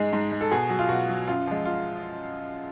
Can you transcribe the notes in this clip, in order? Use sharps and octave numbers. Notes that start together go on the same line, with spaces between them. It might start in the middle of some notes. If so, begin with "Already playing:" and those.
Already playing: G#2 G#3 G#4
G#2
G#3
A4
B2 G#4
F#3
F4
B2 F#4
F#3
F#2 F4
F3 G#3
F4